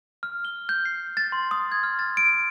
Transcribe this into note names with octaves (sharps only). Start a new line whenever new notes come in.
F6
G7
G6
C7
A6
C6
D#6
G#6
F6
A6
D7